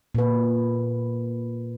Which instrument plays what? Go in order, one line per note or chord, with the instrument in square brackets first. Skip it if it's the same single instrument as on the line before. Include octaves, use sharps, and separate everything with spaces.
[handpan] A#2 B4